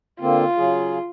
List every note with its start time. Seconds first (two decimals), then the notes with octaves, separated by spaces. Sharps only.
0.21 D3 A#3 C4 F4
0.57 C#3 F#3 G#4